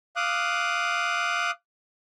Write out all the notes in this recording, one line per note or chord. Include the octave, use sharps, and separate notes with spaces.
F5 D6 D#6 F#6